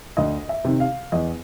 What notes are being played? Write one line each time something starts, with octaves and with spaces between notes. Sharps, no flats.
D2 D#5
E5
C3 D#3
F5
E2 D#5